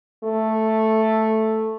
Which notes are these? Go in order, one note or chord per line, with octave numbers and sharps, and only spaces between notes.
A3